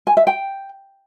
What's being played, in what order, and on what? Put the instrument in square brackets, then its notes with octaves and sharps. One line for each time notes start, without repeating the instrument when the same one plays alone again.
[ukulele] G#5
E5
G5